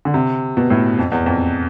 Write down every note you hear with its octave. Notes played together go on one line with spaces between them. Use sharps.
D3
C3
B2
A2
F2
E2
F2